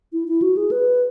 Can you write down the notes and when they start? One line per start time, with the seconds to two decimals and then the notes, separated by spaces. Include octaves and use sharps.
0.13 E4
0.28 E4
0.42 F#4
0.57 G#4
0.71 B4